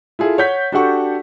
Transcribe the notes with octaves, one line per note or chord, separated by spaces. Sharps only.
E4 F4 G#4 A4
C#5 F#5 G6 B6
D4 F#4 G4 A4 F#5 C#6